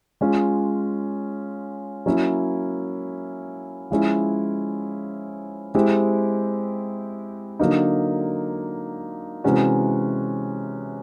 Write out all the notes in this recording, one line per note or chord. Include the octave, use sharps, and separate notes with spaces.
G#3 C#4 F4
F#3 A#3 C#4 E4
F3 G#3 C#4 E4
G#3 C4 E4 G4
D3 F#3 A#3 D#4
C3 E3 G#3 C#4 F#4